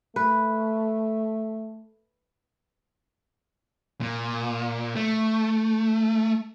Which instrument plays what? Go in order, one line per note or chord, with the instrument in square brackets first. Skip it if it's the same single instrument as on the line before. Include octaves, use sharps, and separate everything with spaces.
[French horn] A3 [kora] B4
[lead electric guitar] A#2
A3